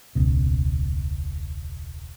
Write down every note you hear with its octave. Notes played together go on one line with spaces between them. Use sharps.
E1 C#2 B2